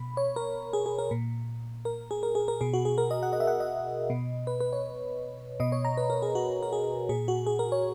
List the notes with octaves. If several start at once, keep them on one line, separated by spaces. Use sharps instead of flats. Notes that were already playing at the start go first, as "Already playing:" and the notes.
Already playing: B2 B5
C#5
A#4
G#4
G#4
A#4
A#2
A#4
G#4
A#4
G#4
A#4
B2 G#4
F#4
G#4
A#4
D#5
F#5
D#5
E5
F#5
D#5
B2
B4
B4
C#5
B2 D#5
C#5
A#5
B4
A#4
G#4
F#4
A#4
G#4
A#2 G#4
F#4
G#4
A#4
C#5